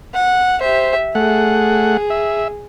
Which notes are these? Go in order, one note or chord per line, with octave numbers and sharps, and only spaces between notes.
F#5
G4 C5 E5
A3 G#4 F#5
E5